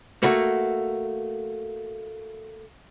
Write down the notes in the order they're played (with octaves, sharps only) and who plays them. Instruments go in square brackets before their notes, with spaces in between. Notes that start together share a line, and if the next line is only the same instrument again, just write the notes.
[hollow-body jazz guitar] A3 A#3 F#4